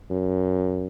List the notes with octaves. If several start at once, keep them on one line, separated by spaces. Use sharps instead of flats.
F#2